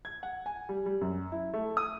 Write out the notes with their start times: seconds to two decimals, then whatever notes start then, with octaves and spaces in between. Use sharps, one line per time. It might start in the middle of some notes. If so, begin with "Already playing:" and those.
0.05 G#6
0.23 F#5
0.46 G#5
0.69 G3
0.86 G3
1.01 F#2
1.32 E4
1.54 A3
1.77 D#6